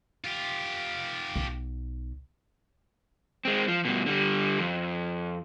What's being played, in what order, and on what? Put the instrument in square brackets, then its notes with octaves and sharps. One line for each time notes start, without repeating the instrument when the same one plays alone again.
[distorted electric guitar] F4 G4
[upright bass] B1
[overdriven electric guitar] G#3 C4
F3
G2 B2
D3 G3
F2